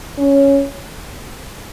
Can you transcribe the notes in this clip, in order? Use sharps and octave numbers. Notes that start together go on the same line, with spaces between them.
C#4